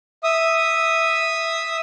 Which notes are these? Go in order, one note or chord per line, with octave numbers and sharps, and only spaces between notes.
E5 D#6